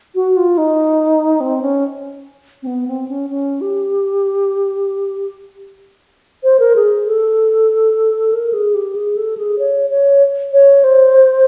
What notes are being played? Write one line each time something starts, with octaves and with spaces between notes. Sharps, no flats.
F#4
F4
D#4
C4
C#4
C4
B3
C4
C#4
C#4
G4
C5
A#4
G#4
A4
A#4
G#4
G4
G#4
A4
G#4
C#5
C#5
C#5
C5